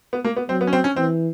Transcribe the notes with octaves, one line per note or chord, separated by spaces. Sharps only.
B3
A#3
B3
F#3 C4
B3
C#4
C4
C#4
E3 C4